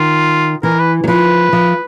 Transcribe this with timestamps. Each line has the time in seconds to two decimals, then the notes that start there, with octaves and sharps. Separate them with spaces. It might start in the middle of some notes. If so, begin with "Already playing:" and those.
Already playing: D#3 F4
0.63 E3 A#4
0.79 B4
1.04 F#3
1.08 F3 B4
1.53 F3